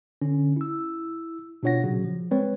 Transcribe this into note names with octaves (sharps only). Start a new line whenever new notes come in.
D3 C#4
E4 E6
B2 D4 F4 C#5 F#5 A#6
A#2 C#3 F#3 F#4
F3
G3 G#3 C4 B4 C#5